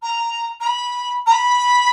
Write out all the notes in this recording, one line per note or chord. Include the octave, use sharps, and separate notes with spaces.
A#5
A#5
B5
A#5
B5